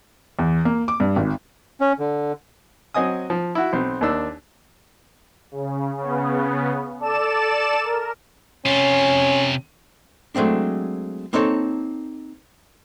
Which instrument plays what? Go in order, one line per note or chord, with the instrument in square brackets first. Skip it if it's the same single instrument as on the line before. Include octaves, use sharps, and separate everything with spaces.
[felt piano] E2
A#3
D6
G2
G#1
[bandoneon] C#4
D3
[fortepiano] F#3 C4 D#5 G#5 D#6
F3
E4 F#4
B1 C4
D#2 A#3 D4 E6
[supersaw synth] C#3
C#3 B3
A4 D5 A5 E7
A#4
[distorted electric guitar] C3 F4 [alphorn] C#4
[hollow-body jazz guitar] F#3 G#3 A3 C4 D4
A#3 C4 D#4 A4 C#5